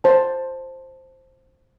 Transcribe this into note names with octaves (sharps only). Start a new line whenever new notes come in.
C5 A5